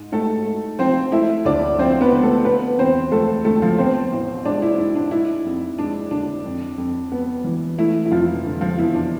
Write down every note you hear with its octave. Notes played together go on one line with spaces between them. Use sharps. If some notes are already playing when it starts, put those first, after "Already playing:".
Already playing: G#2
G#2 A3 A4
A3
F3 C4 C5
A3 E4 E5
D2 D4 D5
F3 C4 C5
B3 B4
D3
A3 A4
B3 B4
E2 C4 C5
F3 A3 A4
D3 A3 A4
F3 F4
B3 C4 C5
A1
G#3 D4 D5
E4
G#2 E4
D4
D4 E4
F2
G#3 D4
D3 D4
F2
F2
B3
E3
A3 E4
E4
F1 F3 F4
D3
F3 F4
E2 E4
D4